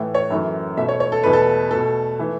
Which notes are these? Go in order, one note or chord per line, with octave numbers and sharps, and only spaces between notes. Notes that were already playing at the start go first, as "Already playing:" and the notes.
Already playing: A2 E3 A3
C#5
F#2 E3 A3
B2 A3 E5
C#5
C#5
A4
E2 B2 A3 B4
A4
B2 A3 A4
E3 A3